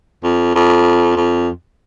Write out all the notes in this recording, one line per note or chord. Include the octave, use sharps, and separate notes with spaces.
F2
F2
F2